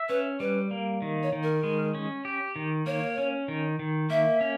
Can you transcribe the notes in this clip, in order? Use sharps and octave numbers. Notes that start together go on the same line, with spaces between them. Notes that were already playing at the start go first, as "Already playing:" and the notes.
Already playing: E5
C#4 B4
G3 B4
A#3
D#3
C#5
D#3
A#4
G#3
C#4
G4
D#3
A#3 C#5
C#4
D#3
D#3
A#3 E5
C#4